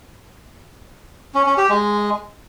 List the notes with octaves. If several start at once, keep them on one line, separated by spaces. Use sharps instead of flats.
C#4
C#4
G4
G#3